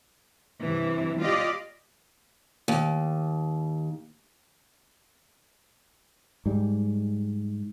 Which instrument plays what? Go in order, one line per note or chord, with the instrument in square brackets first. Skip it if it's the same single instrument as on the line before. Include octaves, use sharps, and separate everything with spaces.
[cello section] G2 C3 E3
F4 G4 D5 D#5
[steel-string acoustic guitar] D#2
[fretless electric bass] G#2 G3